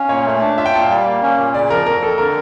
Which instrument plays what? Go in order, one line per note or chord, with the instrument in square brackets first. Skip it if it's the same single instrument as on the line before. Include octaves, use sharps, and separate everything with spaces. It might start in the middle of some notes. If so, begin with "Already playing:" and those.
Already playing: [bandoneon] C#4 [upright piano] F5
[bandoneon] A#2 [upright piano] C#5
[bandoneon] A3
D4
[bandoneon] F4 [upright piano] E5
[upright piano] G5
[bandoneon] A#2 [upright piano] A5
[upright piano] F5
[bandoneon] G3
A#3
C#4
A#2
[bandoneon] C#3 [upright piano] D5
[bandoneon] F3 [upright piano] A#4
[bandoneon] F2 [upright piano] A#4
[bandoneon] F2 [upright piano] A4
[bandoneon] D3 [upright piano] A#4